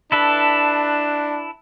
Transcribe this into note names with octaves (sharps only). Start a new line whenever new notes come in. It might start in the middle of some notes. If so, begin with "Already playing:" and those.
D4 E4 A4 B4